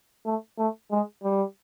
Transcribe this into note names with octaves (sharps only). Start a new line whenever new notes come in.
A3
A3
G#3
G3